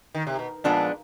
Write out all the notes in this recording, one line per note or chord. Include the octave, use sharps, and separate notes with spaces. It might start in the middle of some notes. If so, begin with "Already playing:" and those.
D#3
C3
B2
A#2 F3 G#3 B3 D4